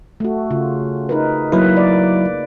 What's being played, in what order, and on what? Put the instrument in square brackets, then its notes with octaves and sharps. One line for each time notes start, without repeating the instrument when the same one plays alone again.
[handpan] A3 F#4
C#3 F4
D#4 A#4 B4
[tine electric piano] F#3 E4 [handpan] A#3 B4
[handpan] D5